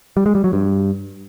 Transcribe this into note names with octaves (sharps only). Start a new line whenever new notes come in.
G3
G#3
G3
F#3
G2